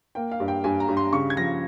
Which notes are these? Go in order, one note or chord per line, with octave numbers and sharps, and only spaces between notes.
A#3 G5
F5
G2
G5
G2 G#5
A#5
G2
C6
C#3 C#6
G#6
F3 A#6